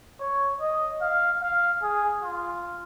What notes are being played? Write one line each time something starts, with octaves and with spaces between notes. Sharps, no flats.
C#5
D#5
F5
F5
G#4
F4